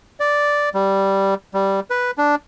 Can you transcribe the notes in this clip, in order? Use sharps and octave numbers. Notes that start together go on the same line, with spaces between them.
D5
G3
G3
B4
D4